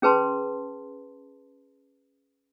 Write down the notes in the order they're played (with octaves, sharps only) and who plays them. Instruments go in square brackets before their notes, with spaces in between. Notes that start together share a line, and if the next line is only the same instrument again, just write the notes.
[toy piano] C#4 G#4 B4 A5 C6